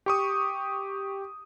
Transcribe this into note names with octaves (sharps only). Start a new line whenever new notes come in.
G4 C#6 D#6